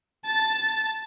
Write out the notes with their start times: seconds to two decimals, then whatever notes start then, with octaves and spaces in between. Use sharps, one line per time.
0.25 A5 A6